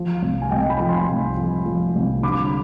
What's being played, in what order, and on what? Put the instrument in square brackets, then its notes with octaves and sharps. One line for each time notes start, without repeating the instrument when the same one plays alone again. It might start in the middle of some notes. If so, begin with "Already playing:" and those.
Already playing: [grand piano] F3
C2
G#5
C2 D#5 G5
G5 B5
F3
G#5 C6
C2
F3
F3
C2
D3 B5 D6